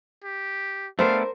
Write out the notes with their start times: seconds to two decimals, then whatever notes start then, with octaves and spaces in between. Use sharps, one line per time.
0.24 G4
0.99 A3 B3 D4 A#4 C5 F5